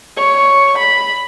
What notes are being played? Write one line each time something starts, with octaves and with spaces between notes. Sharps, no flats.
C#5
B5